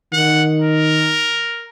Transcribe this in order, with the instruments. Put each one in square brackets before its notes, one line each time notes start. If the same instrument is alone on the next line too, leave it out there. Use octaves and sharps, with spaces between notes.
[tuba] D#3 [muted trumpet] F#5
[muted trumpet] A#4